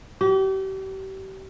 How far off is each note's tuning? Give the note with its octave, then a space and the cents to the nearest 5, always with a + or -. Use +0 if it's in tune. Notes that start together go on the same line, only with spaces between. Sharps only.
G4 -35